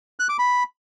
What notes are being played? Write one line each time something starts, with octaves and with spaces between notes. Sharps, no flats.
F#6
D6
B5